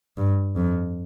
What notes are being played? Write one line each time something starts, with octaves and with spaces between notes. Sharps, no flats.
G2
F2